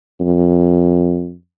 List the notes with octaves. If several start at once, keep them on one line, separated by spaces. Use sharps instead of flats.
F2